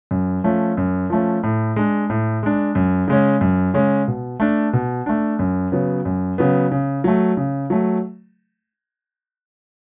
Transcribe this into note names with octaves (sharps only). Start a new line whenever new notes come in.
F#2
F3 A3 C#4
F#2
F3 A3 C#4
A2
G#3 D4
A2
G#3 D4
F#2
C#3 G#3 C#4
F#2
C#3 G#3 C#4
B2
A3 D4
B2
A3 D4
F#2
C#3 F#3 B3
F#2
C#3 F#3 B3
C#3
F#3 A3
C#3
F#3 A3